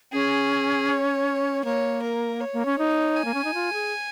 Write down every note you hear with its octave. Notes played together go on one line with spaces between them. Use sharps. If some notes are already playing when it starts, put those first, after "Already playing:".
C#4 G#4
C#5
A#3 C#5
A#4
C#5
A#3
C#4
D#4
G#5
A#3
C#4
D#4
F4
G#4